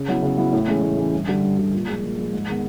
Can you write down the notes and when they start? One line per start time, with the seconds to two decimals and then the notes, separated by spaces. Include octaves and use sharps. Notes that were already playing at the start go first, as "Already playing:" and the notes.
Already playing: C#3
0.08 F#3 B3 E4
0.23 C#3
0.38 F#3 B3 E4
0.53 A2
0.68 E3 G#3 C#4
0.83 A2
0.98 E3 G#3 C#4
1.13 G2
1.28 D3 G3
1.43 G2
1.58 D3 G3
1.73 A#2
1.88 F3 G#3
2.03 A#2
2.18 F3 G#3
2.33 G#2
2.49 D#3 G#3 B3